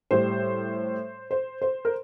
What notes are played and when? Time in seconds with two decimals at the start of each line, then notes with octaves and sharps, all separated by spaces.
0.11 A2 G3 C5
1.31 C5
1.62 C5
1.85 A#4